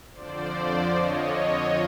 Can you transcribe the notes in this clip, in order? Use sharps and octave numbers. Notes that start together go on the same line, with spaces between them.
F2 D3 F3 C5 D5
C#5 D#5